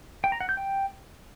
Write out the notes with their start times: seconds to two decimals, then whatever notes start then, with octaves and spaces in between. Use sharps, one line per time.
0.24 G5
0.32 A#5
0.41 F#5
0.49 G6
0.57 G5